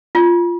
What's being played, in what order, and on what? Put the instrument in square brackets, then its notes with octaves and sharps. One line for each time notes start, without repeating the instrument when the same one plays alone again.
[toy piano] F4